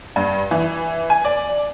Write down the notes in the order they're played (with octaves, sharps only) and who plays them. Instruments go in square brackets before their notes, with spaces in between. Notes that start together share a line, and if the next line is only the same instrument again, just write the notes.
[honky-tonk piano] G2
E3
G#5
D5